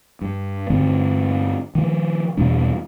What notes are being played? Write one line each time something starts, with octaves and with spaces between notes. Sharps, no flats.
G2
G2 D3 C4
D#3 F3
E2 B2 G3 D4